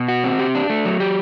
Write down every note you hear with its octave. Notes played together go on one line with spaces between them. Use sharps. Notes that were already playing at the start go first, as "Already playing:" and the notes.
Already playing: B2
F#4
C4
G4
D4
A3
F#3
G4